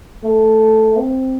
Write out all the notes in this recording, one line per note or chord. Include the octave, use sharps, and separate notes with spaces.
A3
C4